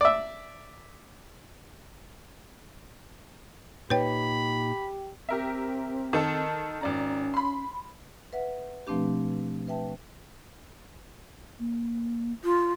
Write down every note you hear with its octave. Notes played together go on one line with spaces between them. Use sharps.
D5 E5
A#2 D#4 G4 B4 C#5 D#5 G5 B5
C4 G4 A#4 E5
D#3 A4
G#1 C#4 D5 A#5
B5 C6
B4 E5 F#5
B2 F3 A3 C4 D4 G4
B4 E5 G5 A5
A#3
F4